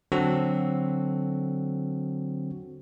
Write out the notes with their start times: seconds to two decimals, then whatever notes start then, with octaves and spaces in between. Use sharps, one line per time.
0.12 D3 F#3 C4 F#4 A4